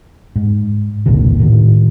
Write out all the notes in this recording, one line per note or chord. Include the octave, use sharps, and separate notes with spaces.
G#2
E1 C2 A#2 D3
A2 D#3